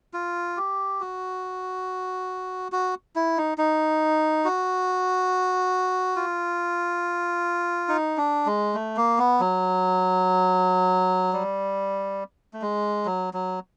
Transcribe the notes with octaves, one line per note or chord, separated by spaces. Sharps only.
F4
G4
F#4
F#4
E4
D#4
D#4
F#4
F4
D#4
D4
G#3
A3
A#3
B3
F#3
G3
A3
G#3
F#3
F#3